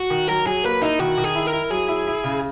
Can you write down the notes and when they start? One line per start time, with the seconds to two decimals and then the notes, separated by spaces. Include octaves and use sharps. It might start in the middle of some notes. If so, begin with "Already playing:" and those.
Already playing: F#4
0.10 D#3
0.28 F#3 A#4
0.46 F#3 G#4
0.64 A#3 B4
0.82 D#4 E4
0.99 D#3 F#4
1.18 D#3
1.24 G#4
1.35 E4
1.47 A#4
1.53 E4
1.71 F#3 G#4
1.88 E4
2.07 E4
2.24 C#3